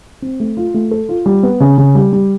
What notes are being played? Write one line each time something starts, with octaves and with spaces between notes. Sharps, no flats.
C4
A3
F4
A3
A4
F4
G3
B3
C#3
C#3
G3
G3